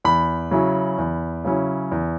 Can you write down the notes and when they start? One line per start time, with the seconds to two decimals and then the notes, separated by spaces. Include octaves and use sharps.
0.04 E2 B5
0.51 C#3 F#3 C#4 E4
0.98 E2
1.44 C#3 F#3 C#4 E4
1.92 E2